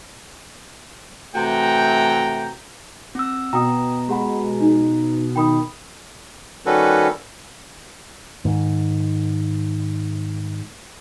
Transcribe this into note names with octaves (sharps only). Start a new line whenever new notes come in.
C3 E3 A3 F#4 G5 A#5
C4 E6
B2 G5 A#5 D#6
G#3 G4 F#5 B5
D#4
D#3 G5 B5 D#6
D#3 G3 C#4 F#4 A4 B4
G#2 D#3